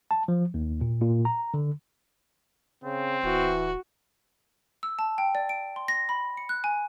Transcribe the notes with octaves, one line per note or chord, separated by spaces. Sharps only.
A5
F3
D#2
A#2
A#2
A#5
D3
C#3 C4
D1 E3 F#4
E6
A5
G5
D5
D7
C6
A#6
B5
C#7
F#6
G#5